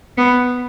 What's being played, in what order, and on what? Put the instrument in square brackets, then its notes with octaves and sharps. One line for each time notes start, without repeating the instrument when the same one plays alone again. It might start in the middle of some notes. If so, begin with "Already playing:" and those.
[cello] B3